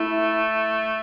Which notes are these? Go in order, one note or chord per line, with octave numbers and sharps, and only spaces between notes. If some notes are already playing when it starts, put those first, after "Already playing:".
Already playing: A3 E4